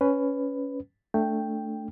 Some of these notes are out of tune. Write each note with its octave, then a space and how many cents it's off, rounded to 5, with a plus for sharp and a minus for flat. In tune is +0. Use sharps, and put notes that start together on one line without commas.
C#4 +10 B4 +10
A3 +5 D4 +0 G5 +0